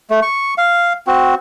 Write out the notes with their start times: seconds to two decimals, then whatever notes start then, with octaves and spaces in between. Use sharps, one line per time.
0.10 A3
0.22 C#6
0.58 F5
1.07 C4 F#4